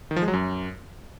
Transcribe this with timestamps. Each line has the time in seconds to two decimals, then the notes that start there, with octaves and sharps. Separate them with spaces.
0.11 D#3
0.16 F3
0.22 G#3
0.28 F#3
0.33 F#2